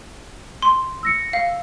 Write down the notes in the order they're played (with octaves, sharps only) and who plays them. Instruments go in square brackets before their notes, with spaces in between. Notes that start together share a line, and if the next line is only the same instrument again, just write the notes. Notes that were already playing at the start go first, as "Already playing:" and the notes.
[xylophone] C6
[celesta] E6 A#6 C#7
[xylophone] F5